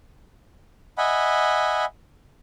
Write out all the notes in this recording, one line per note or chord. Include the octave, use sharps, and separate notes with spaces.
D#5 E5 F#5 G#5 B5